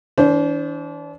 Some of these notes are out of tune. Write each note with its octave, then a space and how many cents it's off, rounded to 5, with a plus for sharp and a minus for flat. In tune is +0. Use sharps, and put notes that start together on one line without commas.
E3 -40 D4 -35 C5 +0